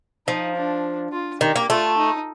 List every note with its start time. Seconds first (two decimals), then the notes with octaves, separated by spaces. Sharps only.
0.27 F3 D#4
0.56 D4
1.12 F4
1.41 D#3 G4
1.56 A#3
1.70 A3 F4
1.98 D#4